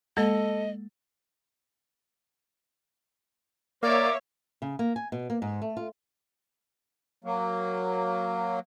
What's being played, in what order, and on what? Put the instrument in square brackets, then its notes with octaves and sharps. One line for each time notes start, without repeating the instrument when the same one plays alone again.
[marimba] G#3 A#3 [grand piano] A4 [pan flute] D#5
[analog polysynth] A#3 [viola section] C#5 E5 [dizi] D5 [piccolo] D6
[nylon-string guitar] C#3
A#3
G#5
B2
A#3
G#2
A3
F4
[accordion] F#3 A#3